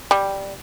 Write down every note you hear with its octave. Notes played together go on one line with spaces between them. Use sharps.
G3